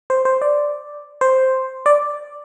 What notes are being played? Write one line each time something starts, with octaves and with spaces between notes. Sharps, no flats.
C5
C5
D5
C5
D5